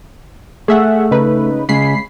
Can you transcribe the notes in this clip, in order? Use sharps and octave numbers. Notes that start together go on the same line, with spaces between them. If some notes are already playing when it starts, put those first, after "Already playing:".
A3 G#4 E5 F#5
C#3 D#4 B4
C#3 G#3 B5 B6 C7